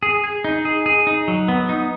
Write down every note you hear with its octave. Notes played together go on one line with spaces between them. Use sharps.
G#4
G#4
D#4
G#4
G#4
D#4
F#3
B3
D#4